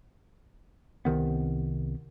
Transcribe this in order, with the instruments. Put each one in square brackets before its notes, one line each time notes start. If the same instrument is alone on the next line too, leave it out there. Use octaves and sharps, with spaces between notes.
[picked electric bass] C2 C3 D#3 B3